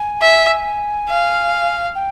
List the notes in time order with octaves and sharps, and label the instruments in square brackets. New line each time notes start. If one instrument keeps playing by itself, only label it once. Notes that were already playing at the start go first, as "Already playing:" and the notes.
Already playing: [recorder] G#5
[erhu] E5
F5
[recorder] G5